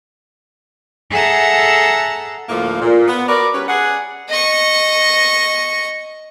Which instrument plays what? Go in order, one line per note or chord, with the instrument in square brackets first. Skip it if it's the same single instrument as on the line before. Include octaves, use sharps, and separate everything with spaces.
[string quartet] G#4 A4 E5 F#5 A5 A#5
[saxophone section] D2 A2 F3 A3 A#3
A#2
B3
F#4 A#4 B4 D5
G3 C#4 B4
G#4 D5 F#5
[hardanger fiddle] D#5 C#6